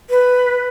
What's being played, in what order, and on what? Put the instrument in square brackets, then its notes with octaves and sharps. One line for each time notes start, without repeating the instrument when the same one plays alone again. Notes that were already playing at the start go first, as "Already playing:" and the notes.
[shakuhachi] B4